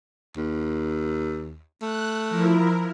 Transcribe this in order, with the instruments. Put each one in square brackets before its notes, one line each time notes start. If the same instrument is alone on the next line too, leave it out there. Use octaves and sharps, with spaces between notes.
[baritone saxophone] D#2
[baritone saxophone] A3 [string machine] F#6
[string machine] F3 E4 A#4